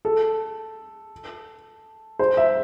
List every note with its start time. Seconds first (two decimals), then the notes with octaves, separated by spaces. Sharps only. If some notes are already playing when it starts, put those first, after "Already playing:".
0.05 A4
2.19 C5
2.37 E5